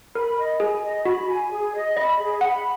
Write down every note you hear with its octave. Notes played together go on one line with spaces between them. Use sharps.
A#4 B5
D#5
G#4 G#5
D#5
F#4 B5
G#5
G#4
D#5
D#5 B5
G#4
F#5 B5